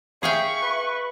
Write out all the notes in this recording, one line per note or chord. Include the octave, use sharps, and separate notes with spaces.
G#4 E5 F5 G5 C#6
B4